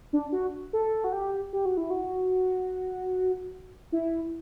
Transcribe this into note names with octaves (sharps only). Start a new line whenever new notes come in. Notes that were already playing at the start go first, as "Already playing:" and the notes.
D4
F#4
A4
F#4
G4
G4
F#4
E4
F#4
E4